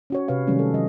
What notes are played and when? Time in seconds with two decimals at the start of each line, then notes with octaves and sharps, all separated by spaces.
0.10 C#4 F#4 C#5
0.28 C3 B4 C#5 F5
0.47 C3 D#3 F#3 G3 A3 C#4
0.59 A4
0.74 F3 F#3 D#5